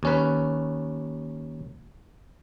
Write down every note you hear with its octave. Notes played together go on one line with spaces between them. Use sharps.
D#2 C#4 B4